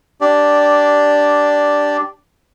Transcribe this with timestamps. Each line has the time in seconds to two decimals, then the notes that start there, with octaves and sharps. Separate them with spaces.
0.21 D4 G4 D5